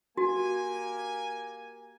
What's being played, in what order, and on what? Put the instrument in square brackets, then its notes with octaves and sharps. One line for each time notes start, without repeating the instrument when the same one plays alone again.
[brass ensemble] A#3 G4 G#5 [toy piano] F#4